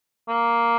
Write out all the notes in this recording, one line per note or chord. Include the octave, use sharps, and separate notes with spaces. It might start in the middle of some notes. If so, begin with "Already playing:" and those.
A#3